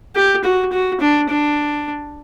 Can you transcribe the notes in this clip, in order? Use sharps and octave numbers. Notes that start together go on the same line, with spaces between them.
G4
F#4
F#4
D4
D4